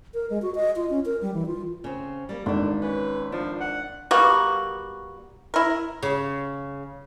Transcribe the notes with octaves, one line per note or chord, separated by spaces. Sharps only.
A#4
G#3
F#4
D#5
F4
C#4
A#4
G3
E3
F4
C#3 C4
G3 A#3
G#1 D3 D4
C#4 B4
F3 D4
F#5
G3 A#3 B3 F#4
E4 A#4
C#3